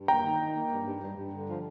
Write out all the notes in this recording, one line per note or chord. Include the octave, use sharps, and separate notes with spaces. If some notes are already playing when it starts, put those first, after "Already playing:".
Already playing: G2
A#3 G5 A#5
D#3
D#4
A#3
G2
G2
G2
G2
D3
F3